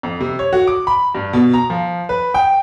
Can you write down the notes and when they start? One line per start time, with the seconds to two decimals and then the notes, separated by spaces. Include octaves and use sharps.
0.03 F2
0.20 C3
0.39 C#5
0.53 F#4
0.67 D6
0.87 B5
1.15 G2
1.33 B2
1.54 A#5
1.70 F3
2.09 B4
2.34 G5